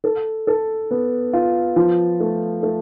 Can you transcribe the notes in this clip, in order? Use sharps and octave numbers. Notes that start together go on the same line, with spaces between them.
A4
A4
B3
F4
F3
A3
A3